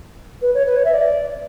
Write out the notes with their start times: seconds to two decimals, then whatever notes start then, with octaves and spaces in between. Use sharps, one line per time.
0.41 B4
0.54 C#5
0.66 B4
0.76 C#5
0.84 E5
0.93 D5